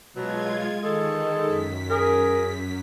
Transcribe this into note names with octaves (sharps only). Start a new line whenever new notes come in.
B2 F#3 G#3 F4 G#6
D#3 G#3 A4
F#2 B6
G#4 A#4